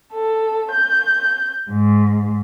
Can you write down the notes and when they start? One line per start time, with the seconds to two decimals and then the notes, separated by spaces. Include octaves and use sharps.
0.13 A4
0.72 G6
1.69 G#2